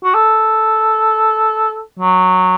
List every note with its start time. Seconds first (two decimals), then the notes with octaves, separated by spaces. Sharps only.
0.04 F#4
0.15 A4
1.99 F#3